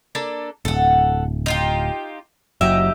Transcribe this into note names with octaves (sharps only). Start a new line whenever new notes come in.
A#3 D4 A4
D1 G#1 A4 F#5
D#4 F4 G4
F#1 F#3 D#4 G4 E5